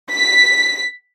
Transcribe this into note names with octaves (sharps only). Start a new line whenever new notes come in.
B6